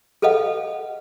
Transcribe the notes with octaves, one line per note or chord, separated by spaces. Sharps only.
G#4 A4 B4 D#5 F5 F#5